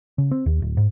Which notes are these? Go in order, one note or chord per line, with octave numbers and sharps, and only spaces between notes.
C#3
C4
D#2
D1
G#2